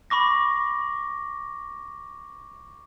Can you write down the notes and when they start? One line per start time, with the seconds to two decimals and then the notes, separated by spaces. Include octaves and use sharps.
0.10 B5 C#6 D6 A#6